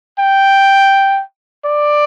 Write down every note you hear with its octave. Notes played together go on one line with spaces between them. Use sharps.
G5
D5